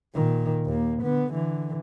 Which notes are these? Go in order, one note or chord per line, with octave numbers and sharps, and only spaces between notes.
A#2 D#3
D#2 A#3
D3 B3
D3 E3